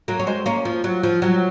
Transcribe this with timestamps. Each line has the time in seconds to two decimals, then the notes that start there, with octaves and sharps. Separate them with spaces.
0.08 F#3 A#3
0.19 C#4
0.27 G#3 C4
0.46 A#3 C#4
0.65 F3
0.84 F#3
1.03 F3
1.22 F#3